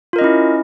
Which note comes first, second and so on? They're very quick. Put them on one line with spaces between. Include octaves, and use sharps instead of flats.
F4 A#4 D#5 C#4 E4